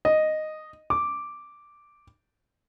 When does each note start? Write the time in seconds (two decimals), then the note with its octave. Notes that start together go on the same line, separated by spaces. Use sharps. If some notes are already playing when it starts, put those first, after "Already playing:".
0.05 D#5
0.90 D6